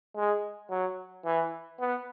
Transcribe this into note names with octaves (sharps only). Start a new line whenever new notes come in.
G#3
F#3
E3
B3